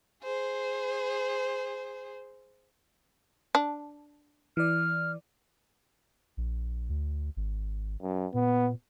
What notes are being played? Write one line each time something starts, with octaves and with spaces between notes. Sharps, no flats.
G#4 C5
D4
E3 D5 F6
A#1
D2
G#1
F#2
A#2 B3